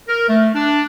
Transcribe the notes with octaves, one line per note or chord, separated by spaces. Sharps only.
A#4
A3
D4